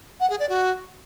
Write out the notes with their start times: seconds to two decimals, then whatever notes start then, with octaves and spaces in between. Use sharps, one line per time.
0.20 F#5
0.30 G#4
0.39 D5
0.49 F#4